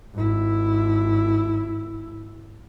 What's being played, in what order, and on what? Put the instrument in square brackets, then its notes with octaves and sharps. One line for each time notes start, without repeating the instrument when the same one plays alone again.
[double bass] G#1 E4